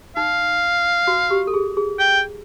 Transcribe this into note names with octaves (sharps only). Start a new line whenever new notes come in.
D#4 F5
F#4
G4
A4
G#4
G#4
G5